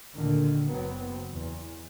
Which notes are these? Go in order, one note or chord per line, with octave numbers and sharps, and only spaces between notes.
D2 A#2 D3 D#3
F#1 F#3 B3 C4
E2